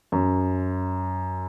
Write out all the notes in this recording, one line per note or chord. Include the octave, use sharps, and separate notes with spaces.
F#2